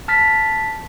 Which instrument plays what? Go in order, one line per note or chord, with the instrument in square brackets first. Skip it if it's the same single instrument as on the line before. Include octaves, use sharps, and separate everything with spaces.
[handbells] A5 F6 A6 B6